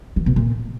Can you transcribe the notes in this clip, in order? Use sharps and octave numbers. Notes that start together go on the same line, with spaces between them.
E3
B2
A#2